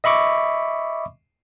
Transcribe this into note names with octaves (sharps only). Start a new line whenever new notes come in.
D#5 E5 B5 C#6 D6